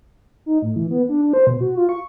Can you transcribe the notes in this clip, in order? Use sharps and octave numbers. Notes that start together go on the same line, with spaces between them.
D#4
A2
E3
B3
D4
D4
C5
B2
F#4
F4
C#6